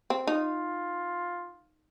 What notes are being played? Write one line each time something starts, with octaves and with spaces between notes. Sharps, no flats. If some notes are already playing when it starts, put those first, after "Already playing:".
C4
D#4 F4